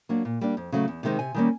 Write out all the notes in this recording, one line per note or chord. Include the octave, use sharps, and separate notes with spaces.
F#3 A#3 D4
A#2
G3 A#3 D4
F2
C#3 F#3 A3
E2
C3 D#3 G#3 C4
C3 G#5
D#3 G3 A#3 C#4